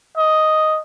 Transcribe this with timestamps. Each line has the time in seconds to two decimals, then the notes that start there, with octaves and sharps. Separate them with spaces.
0.17 D#5